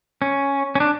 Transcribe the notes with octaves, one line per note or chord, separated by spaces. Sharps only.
C#4
C#4
D4